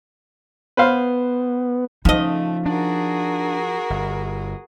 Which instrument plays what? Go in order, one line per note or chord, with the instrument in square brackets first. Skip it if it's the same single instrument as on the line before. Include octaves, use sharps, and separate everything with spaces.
[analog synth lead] B3 [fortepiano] B4 C5 F5
[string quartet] C#3 A3 [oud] F3 D#5 [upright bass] D#4
[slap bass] D4 [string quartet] F#4 G#4 A#4
[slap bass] G1